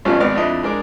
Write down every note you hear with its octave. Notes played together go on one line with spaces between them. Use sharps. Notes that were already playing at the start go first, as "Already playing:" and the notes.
A1 G2 B2 F3 C#4
G#1 B3 D5 F6
F2 D4 E4 D#5
G#3 D4 A#4 D6